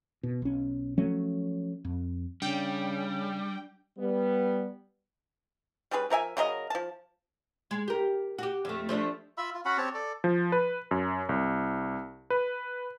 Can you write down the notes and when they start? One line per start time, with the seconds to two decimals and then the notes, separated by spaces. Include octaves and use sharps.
0.23 B2
0.42 B1 C#4
0.98 F3 F#3 A3 C#4
1.85 F2
2.42 C#3 G3 D4 G5
3.98 G3 B3
5.91 G3 C#4 G#4 B4
6.10 F3 A#4 E5 G#5
6.37 C#3 F#3 A#4 D#5
6.70 F3 A5
7.71 G#3
7.88 G4 A#4
8.38 F#4 G4
8.65 F2 A3
8.89 F3 A3 D4
9.38 F4 E5 B5 E6
9.54 F4
9.65 C#4 F#4 F#5 B5
9.78 C4 G4 C#5 A5
9.94 A4 D5
10.24 F3
10.52 B4
10.91 F#2
11.29 C2
12.30 B4